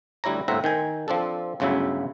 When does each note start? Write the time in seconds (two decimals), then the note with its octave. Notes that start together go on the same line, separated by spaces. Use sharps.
0.24 D2 G3 E4 C#5 A#5
0.48 G1 A2 C4 E5 F#5 A#5
0.64 D#3 G5 G#5
1.08 F3 C4 D4 A4
1.60 G1 D2 C#3 F#3 E4 E5